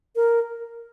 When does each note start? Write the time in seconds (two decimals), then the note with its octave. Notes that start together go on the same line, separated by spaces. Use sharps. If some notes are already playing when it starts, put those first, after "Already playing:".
0.16 A#4